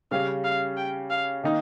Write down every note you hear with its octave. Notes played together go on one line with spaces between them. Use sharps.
C#3 G3 C#4 F5
F5
G5
F5
D#3 A#3 D#4